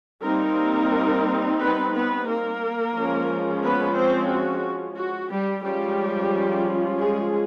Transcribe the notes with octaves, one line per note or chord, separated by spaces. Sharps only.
G3 A#3 C4 D#4 A#4
B3 B4
B3 B4
A#3 A#4
F3 G#3 C#4
B3 B4
C4 C5
F#4
F#4
G3 G4
F3 G3 G#3 C#4 F4 G4
G#3 G#4